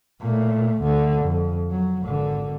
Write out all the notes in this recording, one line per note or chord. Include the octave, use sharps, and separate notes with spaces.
A#2 A3
D2 D3
F2
F#3
G#1 D3